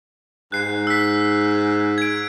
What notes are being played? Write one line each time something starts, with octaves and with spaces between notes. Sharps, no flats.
G#2 F#6 C7
E6 B6
G#6 D7